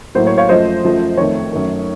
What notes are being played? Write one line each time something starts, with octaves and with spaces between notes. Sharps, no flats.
A2 F#3 A#3 C5
C#5
C#5 F5
F#2 F3 A3 C5 D#5
F#2 F3 A3
F2 D#3 A3 C#5
F#2 D#3 A3